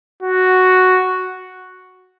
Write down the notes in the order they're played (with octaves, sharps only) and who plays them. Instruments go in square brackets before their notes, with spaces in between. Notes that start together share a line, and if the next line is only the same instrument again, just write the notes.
[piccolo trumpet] F#4